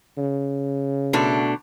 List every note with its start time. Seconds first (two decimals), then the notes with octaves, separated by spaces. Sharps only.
0.18 C#3
1.13 B2 A3 D4